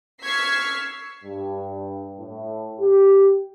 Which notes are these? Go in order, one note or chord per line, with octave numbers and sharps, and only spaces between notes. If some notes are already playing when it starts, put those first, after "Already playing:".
C#6 E6 F6 G#6 B6 C7
G2
A2
G4